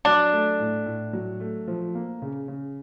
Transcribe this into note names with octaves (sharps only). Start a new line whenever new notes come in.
F#3 D4
A3
A2
A2
F#3
A3
F3
A#3
C#3
C#3